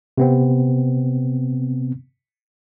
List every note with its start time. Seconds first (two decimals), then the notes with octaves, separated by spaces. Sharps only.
0.18 C3 B3 C4